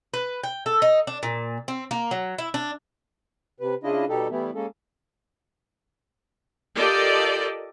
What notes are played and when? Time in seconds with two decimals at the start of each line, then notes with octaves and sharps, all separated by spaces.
0.14 B4
0.43 G5
0.66 A4
0.82 D#4
1.07 D4
1.23 A#2
1.68 C4
1.91 A#3
2.11 F#3
2.38 E4
2.54 D4
3.60 C3 B4
3.84 C#3 D4 E4 F4 D#5
4.09 B2 G3 D#4 G4 A4
4.30 E3 G3 A3 B3 E4
4.55 G#3 A#3 C#4 A4
6.76 F4 G4 A4 A#4 D5 D#5